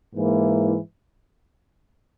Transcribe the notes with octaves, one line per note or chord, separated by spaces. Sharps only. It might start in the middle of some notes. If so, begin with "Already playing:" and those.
G#2 E3 A#3 E4